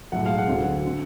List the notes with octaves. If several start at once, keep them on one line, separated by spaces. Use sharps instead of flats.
B1 A2 G#3 F#5
F5
F#5
D2 D3 F#3
D3